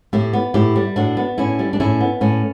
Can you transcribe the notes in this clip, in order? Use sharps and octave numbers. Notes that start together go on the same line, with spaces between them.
A2 E4 G4
B3
A2 E4 G4
G3
A2 D4 F#4
B3
A2 C#4 E4
G3
D4
A2 C#4 E4
B3
A2 C#4